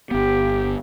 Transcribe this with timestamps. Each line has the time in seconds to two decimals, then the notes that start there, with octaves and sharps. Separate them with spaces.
0.11 G1 B3 G4